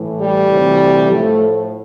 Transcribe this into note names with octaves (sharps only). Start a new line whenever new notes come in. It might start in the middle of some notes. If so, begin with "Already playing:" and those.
Already playing: A2 E3
G3
D2 C3 E3
A2 F3 A3